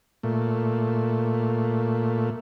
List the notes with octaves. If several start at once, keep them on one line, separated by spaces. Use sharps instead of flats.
A#2 A3